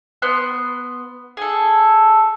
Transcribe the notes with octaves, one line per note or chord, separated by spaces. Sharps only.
B3 C6 F#6
G#4 A4